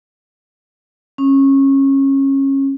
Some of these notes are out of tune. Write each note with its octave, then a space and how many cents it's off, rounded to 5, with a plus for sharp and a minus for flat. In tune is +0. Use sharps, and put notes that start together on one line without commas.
C#4 -25